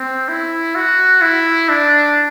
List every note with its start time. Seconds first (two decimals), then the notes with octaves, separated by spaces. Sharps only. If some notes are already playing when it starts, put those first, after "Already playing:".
Already playing: C4
0.29 E4
0.76 F#4
1.22 E4
1.69 D4